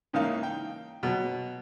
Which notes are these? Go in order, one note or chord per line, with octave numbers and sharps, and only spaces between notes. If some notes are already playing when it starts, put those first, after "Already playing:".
G#2 C#3 E3 A#3 D#4 F5
G5
B2 F#3